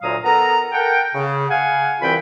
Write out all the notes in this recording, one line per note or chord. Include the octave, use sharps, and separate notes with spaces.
D2 A#2 F#3 F5 A#5 D#6
B3 A4 A#4 A#5
A4 A#4 F#5 G5
C#3
F5 F#5 G#5
C2 E3 C4 F4 G5 B5